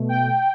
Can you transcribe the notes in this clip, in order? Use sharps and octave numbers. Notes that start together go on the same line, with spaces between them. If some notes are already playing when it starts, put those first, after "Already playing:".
Already playing: B2 A3
G5